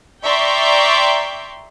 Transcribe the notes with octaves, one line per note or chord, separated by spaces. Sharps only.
D5 E5 G5 A#5 C6 C#6